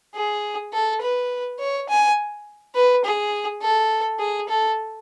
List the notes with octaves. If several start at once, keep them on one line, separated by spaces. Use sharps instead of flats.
G#4
A4
B4
C#5
G#5
B4
G#4
A4
G#4
A4